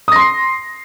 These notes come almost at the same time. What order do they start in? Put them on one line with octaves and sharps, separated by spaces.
D#6 A#6 C6 C7